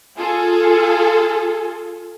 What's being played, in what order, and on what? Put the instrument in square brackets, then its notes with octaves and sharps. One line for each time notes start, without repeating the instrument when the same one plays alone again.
[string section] F4 G#4 A4